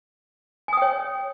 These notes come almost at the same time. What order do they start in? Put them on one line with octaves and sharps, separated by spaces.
G#5 D#6 G5 C#5